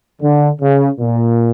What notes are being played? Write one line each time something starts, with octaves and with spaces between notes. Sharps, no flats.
D3
C#3
A#2